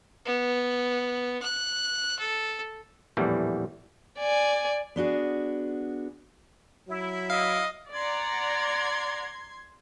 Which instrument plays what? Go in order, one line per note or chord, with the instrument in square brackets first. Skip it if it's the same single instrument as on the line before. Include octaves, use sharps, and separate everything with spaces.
[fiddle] B3
F#6
A4
[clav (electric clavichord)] A#1 E2 A2 E3 G3
[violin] D5 G#5
[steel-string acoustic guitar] B3 D4 F#4 G#4
[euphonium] F#3 [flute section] E4
[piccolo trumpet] D#5 [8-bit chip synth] F5
[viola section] D5 F#5 A#5 [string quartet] C6 G#6